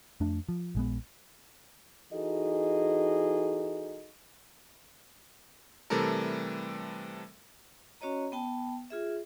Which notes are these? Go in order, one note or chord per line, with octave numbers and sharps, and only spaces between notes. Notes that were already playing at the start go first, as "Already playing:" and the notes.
F2 A3 D4
F3
A#1 G#3 B3
E3 D#4 F#4 G#4 A4 D#5
C3 E3 G3 A3 A4 A#4
C#4 F#4 C#5 D#5 A#5
B3 G5 A5
F4 G#4 E5